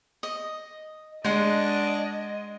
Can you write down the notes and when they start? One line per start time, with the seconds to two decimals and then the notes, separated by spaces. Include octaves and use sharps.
0.23 D#5
1.25 G#3 D4 D#5 F#5 C6